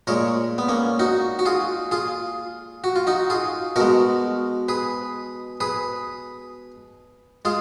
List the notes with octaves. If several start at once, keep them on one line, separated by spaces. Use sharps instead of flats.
A#2 G#3 A#4 C#5
B3
A#3 C#4
D#4 F#4
F#4
F4 G#4
F4 G#4
F#4
F4
D#4 F#4
F4 G#4
B2 G#3 F#4 A#4
G#4 B4
G#4 B4
G#3 F4 G#4